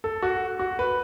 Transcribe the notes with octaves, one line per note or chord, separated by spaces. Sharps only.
A4
F#4
F#4
B4